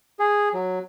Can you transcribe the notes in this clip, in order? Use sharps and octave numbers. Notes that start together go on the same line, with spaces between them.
G#4
F#3